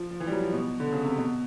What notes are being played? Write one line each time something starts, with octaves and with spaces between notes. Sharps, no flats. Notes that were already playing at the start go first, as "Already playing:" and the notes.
Already playing: F3
F3
E3
G3
F#3
F3
B2
D3
C#3
C3
B2